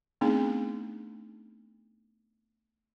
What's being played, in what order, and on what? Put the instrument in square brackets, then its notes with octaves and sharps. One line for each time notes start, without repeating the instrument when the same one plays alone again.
[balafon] A3 B3 C4 D4 D#4 G#4